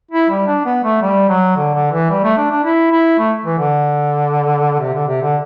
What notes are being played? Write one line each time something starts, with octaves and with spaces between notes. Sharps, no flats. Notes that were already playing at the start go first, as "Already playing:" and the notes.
E4
G3
D4
B3
A3
G3
F#3
D3
D3
E3
G3
A3
D4
D4
E4
E4
A3
E3
D3
C3
D3
C3
D3